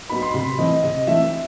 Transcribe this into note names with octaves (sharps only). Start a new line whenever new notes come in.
F#3 B3 D#4 B5
C6
C3 B5
E3 A3 C4 D#4 D#5
C3 D#5
E3 A3 C4 D#4 E5